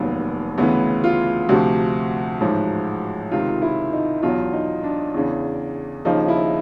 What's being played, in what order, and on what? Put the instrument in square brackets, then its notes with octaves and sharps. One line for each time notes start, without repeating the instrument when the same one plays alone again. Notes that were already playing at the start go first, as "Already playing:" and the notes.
Already playing: [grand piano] F1 D#2 D#3 F#3 B3
D2 C#3 E3 B3
F4
D2 C3 F3 F#4
A1 G#2 F3
C#2 C3 D#3 F4
E4
D#4
E2 B2 F#3 F4
D#4
D4
E2 C#3 E3
D#2 C#3 F3 D#4
E4